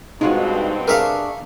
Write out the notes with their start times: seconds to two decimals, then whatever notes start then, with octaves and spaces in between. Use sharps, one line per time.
0.21 G2 B2 G#3 C4 D#4 F4 F#4
0.88 D4 G#4 A#4 E5 F5 C#6